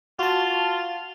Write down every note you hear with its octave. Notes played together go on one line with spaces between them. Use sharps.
F4 F#4 A5